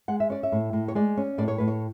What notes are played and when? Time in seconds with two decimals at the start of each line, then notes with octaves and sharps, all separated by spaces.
0.08 G#3 F#5
0.20 E5
0.30 C#4 D5
0.43 E5
0.52 A2
0.73 A2
0.88 C#5
0.95 G#3 D5
1.17 C#4
1.38 A2 D5
1.48 C#5
1.58 A2 B4
1.67 C#5